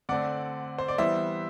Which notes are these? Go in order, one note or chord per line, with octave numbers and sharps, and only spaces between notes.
D3 A3 C4 D5 F#5
C5
D5
E3 G3 B3 C5 E5